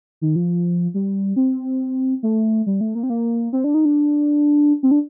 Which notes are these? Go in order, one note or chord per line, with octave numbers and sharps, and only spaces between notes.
D#3
F3
G3
C4
A3
G3
A3
A#3
C4
A#3
C4
D4
D#4
D4
C4
D4